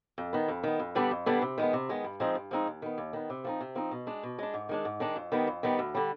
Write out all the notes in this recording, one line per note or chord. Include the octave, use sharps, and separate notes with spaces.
F2
D#3 B3
F2
D#3 B3
F2
D3 G3 B3 D4
F2
D3 G3 B3 D4
C3
D#3 G#3 B3
C3
D#3 G#3 B3
G2
F3 G#3 C4 D#4
G2
F3 G#3 C4 D#4
D#2
D#3 B3
D#2
D#3 B3
C3
F3 C4 D#4
C3
F3 C4 D#4
B2
G#3 D4
B2
G#3 D4
G#2
D#3 G#3 D4
G#2
D#3 G#3 D4
F2
D#3 G3 B3
F2
D#3 G3 B3
D2
D3 G3